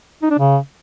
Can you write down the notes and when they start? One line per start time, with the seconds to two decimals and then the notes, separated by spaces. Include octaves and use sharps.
0.22 D#4
0.30 D4
0.38 C#3